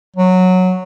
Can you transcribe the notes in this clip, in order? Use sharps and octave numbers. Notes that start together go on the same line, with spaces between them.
F#3